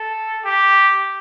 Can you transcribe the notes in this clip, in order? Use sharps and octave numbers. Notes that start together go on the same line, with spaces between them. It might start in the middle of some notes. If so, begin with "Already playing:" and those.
Already playing: A4
G4